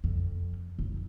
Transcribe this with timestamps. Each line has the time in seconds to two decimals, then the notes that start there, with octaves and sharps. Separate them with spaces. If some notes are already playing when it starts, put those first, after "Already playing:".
0.04 F2
0.79 F1